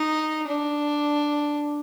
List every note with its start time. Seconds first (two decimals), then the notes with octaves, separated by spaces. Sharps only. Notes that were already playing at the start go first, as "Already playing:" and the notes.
Already playing: D#4
0.48 D4